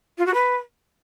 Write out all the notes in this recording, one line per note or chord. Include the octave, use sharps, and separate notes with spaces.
F4
F#4
B4